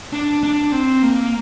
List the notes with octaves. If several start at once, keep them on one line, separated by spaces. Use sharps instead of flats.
D4
D4
C4
A#3